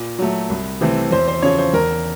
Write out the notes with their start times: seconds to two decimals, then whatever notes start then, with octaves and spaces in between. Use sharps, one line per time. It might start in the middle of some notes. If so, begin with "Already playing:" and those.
Already playing: A#2
0.19 F#3 A3
0.50 C2
0.81 C3 E3 A3 C4
1.11 E2 C5
1.28 C5
1.42 C#3 F3 C#5
1.58 C5
1.74 E2 A#4